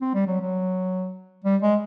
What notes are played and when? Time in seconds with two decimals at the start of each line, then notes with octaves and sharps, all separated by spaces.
0.02 C4
0.15 G3
0.27 F#3
0.41 F#3
1.45 G3
1.63 G#3